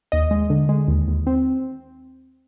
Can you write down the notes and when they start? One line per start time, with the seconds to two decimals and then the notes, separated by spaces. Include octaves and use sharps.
0.12 D#2 D#5
0.31 G#3
0.50 D3
0.69 G#3
0.88 D#2
1.08 D#2
1.27 C4